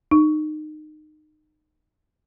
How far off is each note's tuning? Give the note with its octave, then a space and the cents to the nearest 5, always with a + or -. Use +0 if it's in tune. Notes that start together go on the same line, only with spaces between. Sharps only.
D#4 -25